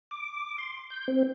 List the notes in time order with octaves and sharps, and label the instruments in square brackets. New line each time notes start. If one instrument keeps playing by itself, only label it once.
[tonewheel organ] D6
C6
G6
C4